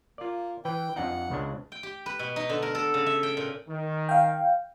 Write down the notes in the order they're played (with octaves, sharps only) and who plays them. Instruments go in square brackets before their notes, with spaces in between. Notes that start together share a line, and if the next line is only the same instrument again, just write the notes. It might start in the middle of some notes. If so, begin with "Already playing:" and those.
[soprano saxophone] A#3 [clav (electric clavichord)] F4 D5
[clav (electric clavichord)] E3 B4 [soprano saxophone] G5
[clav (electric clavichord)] F2 D4 D#4 [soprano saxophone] F#5
[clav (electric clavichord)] C#2 C#3 D4
[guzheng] G5
G4
B4
B2
D#4
D3
A#4
A4
C#3
E5
G5
A#2
[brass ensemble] D#3
[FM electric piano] F5 G5